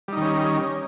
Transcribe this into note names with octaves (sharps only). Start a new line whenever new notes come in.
D#3 G3 C#4 D#4